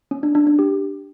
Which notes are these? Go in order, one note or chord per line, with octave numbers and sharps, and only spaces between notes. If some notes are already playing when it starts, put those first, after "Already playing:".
C#4
D4
D4
D4
G4